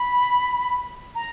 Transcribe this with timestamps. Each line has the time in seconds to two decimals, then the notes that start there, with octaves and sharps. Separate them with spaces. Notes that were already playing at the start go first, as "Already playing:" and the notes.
Already playing: B5
1.15 A#5